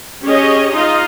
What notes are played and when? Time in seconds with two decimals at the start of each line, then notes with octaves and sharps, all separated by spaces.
0.23 C#4 G4 G#4 C#5 D#5
0.73 D#4 F4 D#5 F5